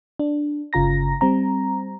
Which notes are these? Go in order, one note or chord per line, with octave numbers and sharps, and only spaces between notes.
D4
G1 C#3 F4 A#5 A#6
G3 C4 A#5